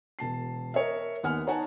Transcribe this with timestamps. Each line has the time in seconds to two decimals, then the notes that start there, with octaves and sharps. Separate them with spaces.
0.19 E1 A5 C7
0.74 A#4 C#5 D#5 E5
1.23 D#2 B3 F#5 G#5 F6
1.47 D#4 C#5 F#5 G#5 A5